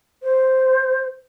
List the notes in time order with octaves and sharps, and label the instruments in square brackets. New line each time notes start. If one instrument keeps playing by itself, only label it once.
[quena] C5